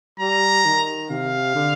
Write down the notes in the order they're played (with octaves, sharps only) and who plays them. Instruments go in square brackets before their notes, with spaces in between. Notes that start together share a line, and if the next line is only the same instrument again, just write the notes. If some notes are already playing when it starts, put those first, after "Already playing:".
[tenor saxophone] G3 [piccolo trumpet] A#5
[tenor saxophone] D#3
[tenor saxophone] C3 [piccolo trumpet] F5
[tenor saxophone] D3